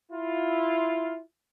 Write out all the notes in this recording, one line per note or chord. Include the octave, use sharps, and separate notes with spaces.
E4 F4